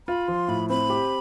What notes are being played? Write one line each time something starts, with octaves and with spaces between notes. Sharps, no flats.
F4 B5
F3 C6
A2 B5
C4 B5
G4